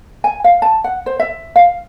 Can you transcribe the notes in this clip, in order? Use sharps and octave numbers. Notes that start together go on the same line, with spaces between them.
G#5
F5
A5
F#5
C5
E5
F5